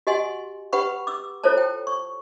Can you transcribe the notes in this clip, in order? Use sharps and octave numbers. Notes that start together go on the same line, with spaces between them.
F#4 G4 D#5 F#5 G#5 C6
G4 B4 F#5 G5 B5 C#6
D6 E6
E4 F4 A4 C5 C#5 A5
G5
C#6